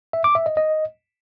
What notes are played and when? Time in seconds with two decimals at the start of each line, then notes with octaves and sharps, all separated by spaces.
0.13 E5
0.24 D6
0.35 E5
0.46 D#5
0.57 D#5